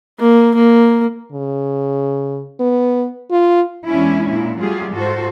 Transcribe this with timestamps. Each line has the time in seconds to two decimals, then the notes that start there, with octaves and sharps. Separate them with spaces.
0.19 A#3
0.55 A#3
1.32 C#3
2.60 B3
3.31 F4
3.88 E2 G#3 C#4 D4 E4
4.30 A#2 E4
4.60 F#3 G3 A3 F4 G4 G#4
4.94 G#2 F4 F#4 A4 C5